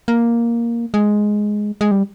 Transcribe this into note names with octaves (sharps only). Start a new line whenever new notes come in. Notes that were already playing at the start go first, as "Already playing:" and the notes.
A#3
G#3
G#3
G3